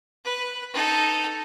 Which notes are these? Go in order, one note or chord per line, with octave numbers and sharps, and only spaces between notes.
B4
D#4 A4